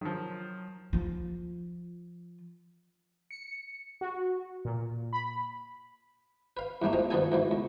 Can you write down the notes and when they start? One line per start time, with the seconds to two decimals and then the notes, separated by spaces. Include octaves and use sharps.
0.01 D#3 F3 F#3
0.93 F3 F4
3.31 C#7
4.01 F#4
4.65 A#2
5.13 B5
6.57 B4 F5
6.82 E2 G2 G3 A3 A#3
6.93 F3 G#3 F4
7.10 G2 D#3 F3 B3 A4 G#5
7.32 B1 G#2 E3
7.51 C#2